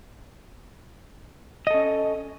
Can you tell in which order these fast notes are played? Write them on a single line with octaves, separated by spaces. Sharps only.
D#5 A4 C#4